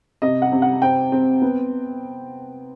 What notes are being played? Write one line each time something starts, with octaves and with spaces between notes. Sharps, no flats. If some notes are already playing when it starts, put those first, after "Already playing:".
C3 D#5
F#5
C3
F#5
C4 G5
C4
B3